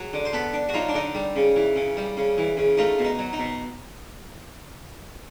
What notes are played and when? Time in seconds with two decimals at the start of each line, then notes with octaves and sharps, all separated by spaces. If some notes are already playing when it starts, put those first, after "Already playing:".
Already playing: F#3 G#4
0.13 D3
0.25 C5
0.33 B3 A4 B4
0.53 D4
0.69 F#4
0.74 F#3 D#4 F4
0.89 D4
0.94 D3 D#4
1.15 G3
1.36 C#3
1.56 E3
1.76 C#3
1.97 G3
2.17 C#3
2.38 E3
2.57 C#3
2.77 A3 D#4 F4
2.99 B2
3.05 D#4
3.19 F#3
3.33 D#4
3.39 B2